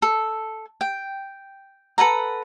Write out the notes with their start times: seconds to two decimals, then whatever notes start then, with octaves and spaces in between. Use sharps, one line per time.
0.02 A4
0.81 G5
1.98 A4 B4 F#5 A#5